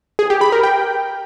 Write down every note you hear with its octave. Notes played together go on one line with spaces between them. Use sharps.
G#4
G4
B5
A#4
G5